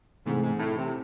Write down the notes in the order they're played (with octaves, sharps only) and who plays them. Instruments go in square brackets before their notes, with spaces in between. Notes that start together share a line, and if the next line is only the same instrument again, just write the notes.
[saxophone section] G#2 [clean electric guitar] C3 E3 A3 C4
[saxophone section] G#2
A2
C3